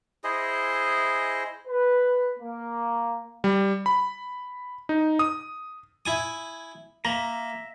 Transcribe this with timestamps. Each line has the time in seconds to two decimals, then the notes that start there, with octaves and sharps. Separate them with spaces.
0.24 E4 G#4 C5 D#5
1.68 B4
2.38 A#3
3.44 G3
3.86 B5
4.89 D#4
5.19 D#6
6.06 E4 G#5 D#6
7.05 A#3 E5 A#5